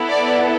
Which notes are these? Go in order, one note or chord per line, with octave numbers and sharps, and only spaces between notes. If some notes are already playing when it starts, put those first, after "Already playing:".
Already playing: B3 E4 A4
D5